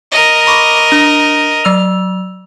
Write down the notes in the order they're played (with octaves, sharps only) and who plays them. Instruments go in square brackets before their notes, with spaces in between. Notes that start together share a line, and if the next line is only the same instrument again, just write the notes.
[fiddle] A#4 D#5
[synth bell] B5 C#6 D6
D4
F#3 E6 F7